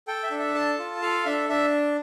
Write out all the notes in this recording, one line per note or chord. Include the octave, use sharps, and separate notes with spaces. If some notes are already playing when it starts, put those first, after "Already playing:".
A4 G5
E5
D4
E5
A4 A5
F4
A4 F5
D4 E5
D4 E5